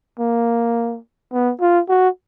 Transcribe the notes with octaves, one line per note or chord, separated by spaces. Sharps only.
A#3
B3
F4
F#4